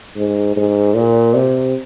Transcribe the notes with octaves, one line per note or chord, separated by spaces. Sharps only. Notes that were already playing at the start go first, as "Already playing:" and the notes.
G#2
G#2
A#2
C3